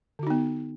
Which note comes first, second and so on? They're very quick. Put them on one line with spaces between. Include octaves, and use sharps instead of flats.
D3 F#4 D#4 B3